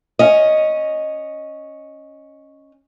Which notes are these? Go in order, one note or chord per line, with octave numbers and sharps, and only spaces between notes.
C#4 D#5